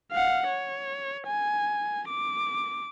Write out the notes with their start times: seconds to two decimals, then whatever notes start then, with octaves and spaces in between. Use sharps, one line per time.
0.12 F5 F#5
0.47 C#5
1.27 G#5
2.09 D6